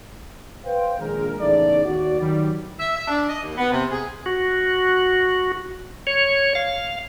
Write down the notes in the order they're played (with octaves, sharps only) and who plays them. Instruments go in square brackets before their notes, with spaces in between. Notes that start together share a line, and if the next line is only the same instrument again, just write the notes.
[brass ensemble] B4 C5 F5 G5
A#1 D#3 G#3 A#4
E2 A2 C#3 A3 D#4 D5
D#2 F#4 D5
D#3 F#3 G3
[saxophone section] E5
E5
D4
D#5
D#2
B3
C3
G#4
[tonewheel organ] F#4
C#5
F5